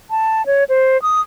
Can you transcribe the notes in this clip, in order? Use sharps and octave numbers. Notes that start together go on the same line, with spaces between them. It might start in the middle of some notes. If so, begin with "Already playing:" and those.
A5
C#5
C5
D#6